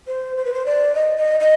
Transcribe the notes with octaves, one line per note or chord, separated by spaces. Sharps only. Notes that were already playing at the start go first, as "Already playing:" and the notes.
C5
C5
B4
C5
D5
D#5
D#5
D#5